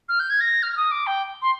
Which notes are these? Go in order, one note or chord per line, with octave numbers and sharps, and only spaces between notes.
F6
G6
G#6
A#6
F6
F6
D#6
D6
G5
C6